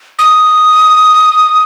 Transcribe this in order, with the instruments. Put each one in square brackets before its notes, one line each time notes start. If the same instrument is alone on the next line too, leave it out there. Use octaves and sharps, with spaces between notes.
[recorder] D#6